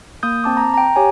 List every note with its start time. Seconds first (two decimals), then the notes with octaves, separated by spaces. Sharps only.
0.23 A#3 D#6 G6
0.44 C4 A5 D6
0.57 A#5
0.74 G5 A#5
0.96 G4 C#5 G#5